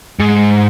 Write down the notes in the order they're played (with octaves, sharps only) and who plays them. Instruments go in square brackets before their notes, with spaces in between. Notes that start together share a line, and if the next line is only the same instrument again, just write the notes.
[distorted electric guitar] G#2